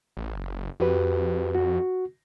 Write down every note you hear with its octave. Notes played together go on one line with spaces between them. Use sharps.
A1
F#1
F2 F#4 G4 B4
F#4